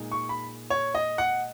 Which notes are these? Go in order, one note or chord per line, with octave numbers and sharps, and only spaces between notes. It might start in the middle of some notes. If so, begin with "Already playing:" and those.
Already playing: A#2 G#3 D#4
C#6
B5
C#5
D#5
F#5